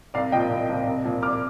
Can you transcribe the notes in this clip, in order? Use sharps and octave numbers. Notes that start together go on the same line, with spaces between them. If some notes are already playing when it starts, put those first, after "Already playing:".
C2 D5 F5
A#2 F3 D#5 G5
C2
A#2 F3
C2
A#2 F3
C2 D6 F6